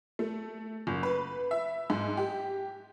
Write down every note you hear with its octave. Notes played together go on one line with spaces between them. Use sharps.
A3
F#1
B4
E5
G#2
G4